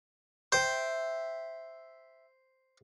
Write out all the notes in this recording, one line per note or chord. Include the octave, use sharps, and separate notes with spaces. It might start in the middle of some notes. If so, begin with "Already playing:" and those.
C5 E5 G5